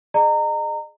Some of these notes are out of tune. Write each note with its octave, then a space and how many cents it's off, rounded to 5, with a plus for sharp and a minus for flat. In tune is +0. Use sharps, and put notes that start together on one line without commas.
G#4 +10 D#5 -45 A#5 -25